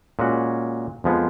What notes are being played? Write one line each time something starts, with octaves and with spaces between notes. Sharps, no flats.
A#2 G#3 C#4 F#4
F2 F3 G#3 B3